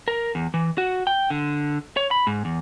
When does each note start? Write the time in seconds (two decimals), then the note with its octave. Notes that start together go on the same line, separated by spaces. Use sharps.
0.08 A#4
0.35 E2
0.54 E3
0.78 F#4
1.07 G5
1.30 D3
1.97 C#5
2.11 B5
2.27 G#2
2.45 E2